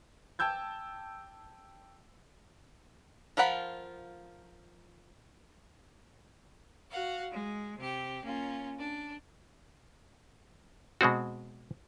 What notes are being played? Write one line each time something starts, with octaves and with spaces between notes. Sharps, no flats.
G5 A5 E6 G6 G#6
F3 F4 A#4 F#5 B5
F#4 F5 F#5
G#3
C3 G4
A#3 C#4 F4
D4
B2 G#3 C4 F#4